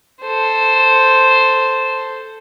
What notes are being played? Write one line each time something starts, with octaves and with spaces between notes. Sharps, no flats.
A4 C5